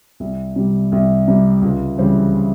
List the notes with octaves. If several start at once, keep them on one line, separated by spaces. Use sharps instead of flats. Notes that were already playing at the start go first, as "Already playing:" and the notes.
C2
C3 G3
C2
C3 G3
C#2
C#3 E3 G3 C4